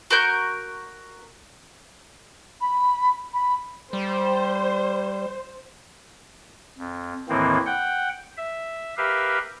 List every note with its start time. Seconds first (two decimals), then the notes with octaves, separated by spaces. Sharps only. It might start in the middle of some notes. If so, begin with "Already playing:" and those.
0.10 F#4 A#4 G6
2.60 B5
3.33 B5
3.93 G3 C5
6.78 F2
7.29 D#2 A2 D#3 E3 A#3 C4
7.66 F#5 G5
8.37 E5
8.97 G4 A#4 B4 E5 F5